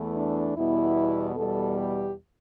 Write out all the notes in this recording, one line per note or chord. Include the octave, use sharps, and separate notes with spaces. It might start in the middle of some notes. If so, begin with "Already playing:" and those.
Already playing: E2 E3 A3
D4
E2 B2 G3 E4
E2 B2 G3 A4
G4